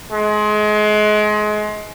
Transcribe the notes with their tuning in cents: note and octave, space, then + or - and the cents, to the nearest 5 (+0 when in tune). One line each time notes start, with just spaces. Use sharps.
G#3 +30